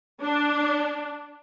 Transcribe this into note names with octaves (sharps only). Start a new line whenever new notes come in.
D4